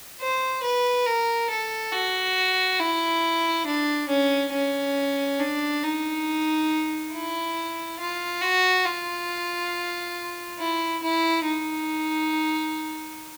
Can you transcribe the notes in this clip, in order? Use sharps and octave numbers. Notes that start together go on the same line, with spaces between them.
C5
B4
A#4
A4
F#4
E4
D4
C#4
C#4
D4
D#4
E4
F4
F#4
F4
E4
E4
D#4